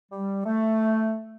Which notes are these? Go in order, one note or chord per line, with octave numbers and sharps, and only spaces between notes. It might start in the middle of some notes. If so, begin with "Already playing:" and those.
G3
A3